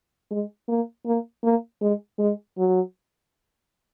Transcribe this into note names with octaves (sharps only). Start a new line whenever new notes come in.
G#3
A#3
A#3
A#3
G#3
G#3
F#3